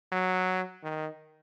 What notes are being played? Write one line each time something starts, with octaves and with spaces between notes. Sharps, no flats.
F#3
D#3